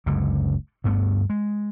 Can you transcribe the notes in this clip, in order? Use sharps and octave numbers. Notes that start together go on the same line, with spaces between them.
F#1 C#2 F#2 D3
D2 G2 A3 B3
G#3